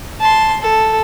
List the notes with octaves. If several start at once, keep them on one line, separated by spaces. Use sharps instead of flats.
A5 C6
A4